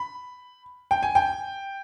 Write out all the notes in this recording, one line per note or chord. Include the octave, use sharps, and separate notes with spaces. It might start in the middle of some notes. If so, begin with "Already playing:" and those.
Already playing: B5
G5
G#5
G5